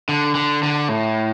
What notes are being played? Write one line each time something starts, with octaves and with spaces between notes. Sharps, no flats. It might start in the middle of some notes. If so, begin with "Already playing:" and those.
D3
D3
D3
A2